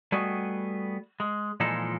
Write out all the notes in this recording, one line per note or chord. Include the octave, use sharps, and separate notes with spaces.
G3 A3 B3 F#4 G#4 D#5
G#3
A#2 E3 F3 G#3 D#4 A4